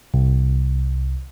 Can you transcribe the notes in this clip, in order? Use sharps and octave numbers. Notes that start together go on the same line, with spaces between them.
C2